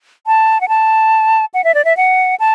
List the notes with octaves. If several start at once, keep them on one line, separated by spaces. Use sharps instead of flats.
A5
F#5
A5
F#5
E5
D5
E5
F#5
A5